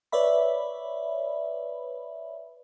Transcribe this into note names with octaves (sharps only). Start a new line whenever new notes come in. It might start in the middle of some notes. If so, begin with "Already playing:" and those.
B4 C#5 D5 E5 B5